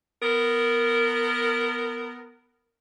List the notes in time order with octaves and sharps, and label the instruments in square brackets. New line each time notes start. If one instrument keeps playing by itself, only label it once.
[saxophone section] B3 A#4